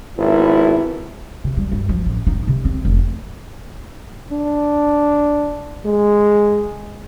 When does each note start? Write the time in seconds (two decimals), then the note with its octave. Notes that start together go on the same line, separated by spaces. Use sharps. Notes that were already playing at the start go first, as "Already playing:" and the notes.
0.18 G#1 F#2 B3 E4
1.44 C3
1.57 G3
1.72 G2
1.89 F3
2.06 A1
2.27 D#4
2.47 C3
2.65 C4
2.85 F1
4.32 D4
5.85 G#3